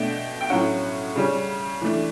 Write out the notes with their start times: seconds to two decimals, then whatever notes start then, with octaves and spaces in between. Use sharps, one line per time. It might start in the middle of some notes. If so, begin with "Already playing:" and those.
Already playing: B2 A3 D4 G5
0.41 G5
0.50 A2 F#3 C#4 F#5
1.16 C#3 G3 C#4
1.82 E3 A3 D4